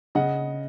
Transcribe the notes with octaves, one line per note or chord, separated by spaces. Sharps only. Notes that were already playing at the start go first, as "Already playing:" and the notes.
C#3 D#5 F#5